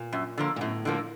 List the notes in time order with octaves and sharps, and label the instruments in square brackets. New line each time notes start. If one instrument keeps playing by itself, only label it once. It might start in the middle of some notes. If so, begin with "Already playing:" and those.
Already playing: [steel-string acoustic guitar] A#2
[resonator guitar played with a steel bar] F#2
D3 F3 A#3
[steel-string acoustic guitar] A#2
[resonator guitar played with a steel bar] F#2 [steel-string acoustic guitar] A2
[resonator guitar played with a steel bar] D3 F3 A#3